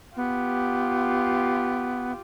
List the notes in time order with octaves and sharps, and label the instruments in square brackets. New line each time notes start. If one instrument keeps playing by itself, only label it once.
[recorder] B3 [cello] F4 G4